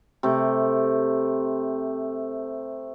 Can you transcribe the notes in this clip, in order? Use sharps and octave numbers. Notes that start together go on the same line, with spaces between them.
C3 A3